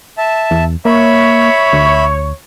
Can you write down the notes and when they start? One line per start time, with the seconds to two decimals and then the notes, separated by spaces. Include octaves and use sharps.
0.18 E5 A5
0.51 E2
0.85 A#3 C#5 E5 B5
1.73 D2